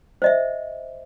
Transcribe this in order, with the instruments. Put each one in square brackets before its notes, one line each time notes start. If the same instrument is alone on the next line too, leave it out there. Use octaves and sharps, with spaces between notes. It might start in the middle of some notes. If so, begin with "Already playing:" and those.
[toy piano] C5 D#5 E5